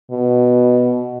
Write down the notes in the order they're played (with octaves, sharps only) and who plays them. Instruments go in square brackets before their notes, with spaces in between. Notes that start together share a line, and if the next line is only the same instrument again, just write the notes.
[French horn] B2